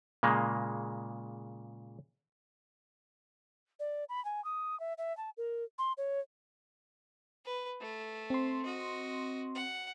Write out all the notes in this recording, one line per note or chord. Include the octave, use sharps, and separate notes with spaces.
A#2 C#3 G#3 A#3
D5
B5
G#5
D#6
E5
E5
A5
A#4
C6
C#5
B4
A3
C4 C6
F#4 D#5
F#5